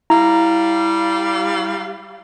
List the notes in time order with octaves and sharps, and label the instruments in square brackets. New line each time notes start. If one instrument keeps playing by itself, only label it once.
[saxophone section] G3 F5 [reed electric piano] E4 [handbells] A#5